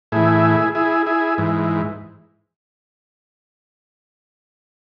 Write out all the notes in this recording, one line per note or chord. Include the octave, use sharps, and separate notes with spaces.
A2 E3 E4 G#4
E4 G#4
E4 G#4
G#2 E3